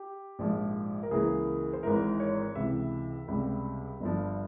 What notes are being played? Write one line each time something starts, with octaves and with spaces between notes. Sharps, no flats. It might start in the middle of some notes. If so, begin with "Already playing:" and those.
Already playing: G4
A#1 G#2 F3 G#3
A#4
C#2 C#3 E3 A#3 G#4
C5
G#1 G#2 E3 A#4
C#5
C#2 C3 E3 E5
C#2 C3 G3
G1 G2 F3